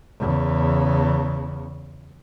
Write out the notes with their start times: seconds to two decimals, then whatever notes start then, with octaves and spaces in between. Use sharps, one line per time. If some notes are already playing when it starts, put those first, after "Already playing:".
0.19 E2 C#3